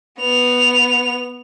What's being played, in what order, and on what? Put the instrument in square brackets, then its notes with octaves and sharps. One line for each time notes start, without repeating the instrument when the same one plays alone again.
[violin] B3 F7